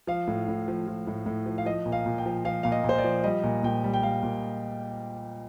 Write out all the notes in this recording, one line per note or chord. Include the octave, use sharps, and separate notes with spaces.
F3 F5
A2
A2
F3
F3
A2
A2
F3
F5
F3 D#5
A#2
F5
A#2
G5
F3
F3 F5
A#2 F5
D#5
A#2
C5
D5
F3
G3 D#5
A#2
A#2 G5
G3
G5
G3 F5
A#2